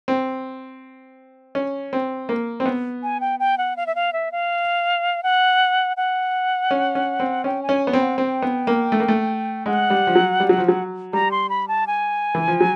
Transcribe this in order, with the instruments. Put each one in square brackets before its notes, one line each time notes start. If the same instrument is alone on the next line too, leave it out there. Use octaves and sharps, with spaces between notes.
[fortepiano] C4
C#4
C4
A#3
C4
B3
[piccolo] G#5
G5
G5
F#5
F5
E5
F5
E5
F5
F#5
F#5
[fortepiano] C#4
C#4
C4
[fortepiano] C#4 [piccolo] G5
[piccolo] G#5
[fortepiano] C#4
B3
C4
[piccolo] F#5
[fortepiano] C4 [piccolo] G5
[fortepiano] B3
A#3
A3
A#3
A3
[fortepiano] G#3 [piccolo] F#5
[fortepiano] G3
F3
F#3
G3
F#3
F3
F#3
[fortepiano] G3 [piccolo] A#5
[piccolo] C6
B5
A5
G#5
[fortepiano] E3
F3
F#3